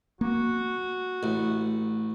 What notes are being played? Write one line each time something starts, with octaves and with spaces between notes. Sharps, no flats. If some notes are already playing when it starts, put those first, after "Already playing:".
A#3 F#4
A1